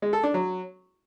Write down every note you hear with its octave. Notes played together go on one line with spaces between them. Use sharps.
G#3
A4
D4
F#3